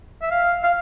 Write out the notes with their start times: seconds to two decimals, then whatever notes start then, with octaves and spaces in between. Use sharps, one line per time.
0.22 E5
0.31 F5
0.64 F5